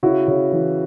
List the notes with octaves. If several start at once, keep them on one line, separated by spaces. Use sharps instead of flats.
C#3 E4 F#4
C#3
E3